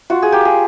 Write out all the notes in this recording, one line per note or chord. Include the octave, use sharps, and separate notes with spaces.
F4 F#4
G#4
A#3 G4
G#4